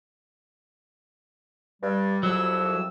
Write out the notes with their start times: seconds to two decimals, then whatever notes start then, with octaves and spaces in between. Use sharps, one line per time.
1.82 G2 G3
2.23 C2 F2 F#3 E6